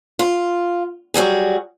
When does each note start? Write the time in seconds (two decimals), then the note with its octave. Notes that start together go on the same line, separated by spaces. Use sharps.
0.19 F4
1.14 F#3 G3 F#4 G#4